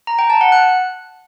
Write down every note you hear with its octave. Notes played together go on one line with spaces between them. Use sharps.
A#5
G5
A5
F#5
F#6